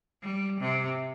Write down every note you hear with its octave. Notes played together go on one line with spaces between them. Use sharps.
G3
C3